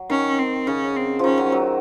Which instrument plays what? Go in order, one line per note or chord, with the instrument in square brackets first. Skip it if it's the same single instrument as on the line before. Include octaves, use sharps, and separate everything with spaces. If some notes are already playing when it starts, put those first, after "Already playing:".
Already playing: [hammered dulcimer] F#3
[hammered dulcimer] D#3 [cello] C#4
[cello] C4
[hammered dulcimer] C#3 [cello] C#4
[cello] C4
[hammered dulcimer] D#3 F3 [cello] C#4
[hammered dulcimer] F#3
F#3